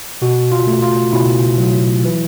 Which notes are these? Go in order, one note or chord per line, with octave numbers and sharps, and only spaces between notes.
B2 F#4
F4
A3
F4
B2 E4
F#3
E3